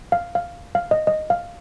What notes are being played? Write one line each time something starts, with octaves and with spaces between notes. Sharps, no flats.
F5
F5
F5
D#5
D#5
F5